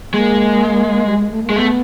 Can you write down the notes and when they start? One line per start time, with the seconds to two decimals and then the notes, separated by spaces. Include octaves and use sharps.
0.14 G#3 A#3
1.06 G3
1.18 G#3
1.31 A3
1.43 A#3
1.50 G#3
1.56 A3 B3